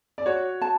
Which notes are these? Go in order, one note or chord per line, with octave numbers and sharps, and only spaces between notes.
D5
F#4 C#5
A5